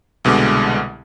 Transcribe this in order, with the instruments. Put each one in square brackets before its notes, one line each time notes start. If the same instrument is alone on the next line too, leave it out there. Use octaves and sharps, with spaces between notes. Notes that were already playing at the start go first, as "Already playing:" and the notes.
[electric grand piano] C2 B2 D3 G#3 D6